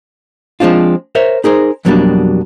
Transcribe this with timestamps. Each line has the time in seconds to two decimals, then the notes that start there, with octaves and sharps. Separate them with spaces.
0.60 F3 G#3 C4 D4 F4
1.15 A#4 C5 C#5 E5
1.44 D#4 G#4 A#4 C5
1.85 F2 B2 F#3 G3 A#3 D4